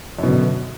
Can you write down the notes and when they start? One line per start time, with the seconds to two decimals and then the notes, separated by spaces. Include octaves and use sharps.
0.19 F#2
0.23 B2
0.28 D3